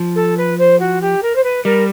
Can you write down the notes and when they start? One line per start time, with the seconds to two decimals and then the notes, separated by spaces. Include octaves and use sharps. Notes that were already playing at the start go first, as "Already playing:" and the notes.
Already playing: F3
0.15 A4
0.37 B4
0.58 C5
0.79 F#4
1.01 G4
1.22 A#4
1.35 C5
1.43 B4
1.65 G3 A#4